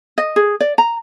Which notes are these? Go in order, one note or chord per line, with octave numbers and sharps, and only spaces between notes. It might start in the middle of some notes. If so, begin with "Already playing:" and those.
D#5
G#4
D5
A#5